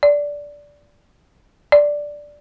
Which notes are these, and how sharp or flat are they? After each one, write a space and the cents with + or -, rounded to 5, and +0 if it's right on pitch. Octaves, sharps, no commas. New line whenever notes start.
D5 -10
D5 +0